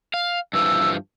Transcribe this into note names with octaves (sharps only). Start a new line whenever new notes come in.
F5
G2 E3 F3 E6